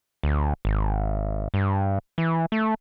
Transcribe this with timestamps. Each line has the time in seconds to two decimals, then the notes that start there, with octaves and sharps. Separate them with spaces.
0.23 D2
0.65 G#1
1.54 G2
2.18 E3
2.52 A3